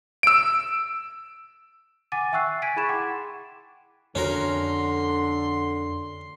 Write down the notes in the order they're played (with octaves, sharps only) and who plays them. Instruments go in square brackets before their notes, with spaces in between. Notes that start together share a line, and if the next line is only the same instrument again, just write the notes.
[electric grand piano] E6 D7
[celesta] F#5 G#5 D6 A6 D#7
E5 G5 C#6 E6 F#6 C7
G#5 G#6 A6 B6 D7 D#7
E4 G#4 B5 C#6 G#6 E7
F#5 G5 C6 D6
[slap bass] F2 [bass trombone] D3 [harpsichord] C#4 F#4 A#4 [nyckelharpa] C6